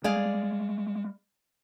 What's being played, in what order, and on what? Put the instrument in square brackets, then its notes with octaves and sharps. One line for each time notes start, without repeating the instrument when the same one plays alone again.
[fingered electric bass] G3 G#3 [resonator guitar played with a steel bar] G#4 D5 F5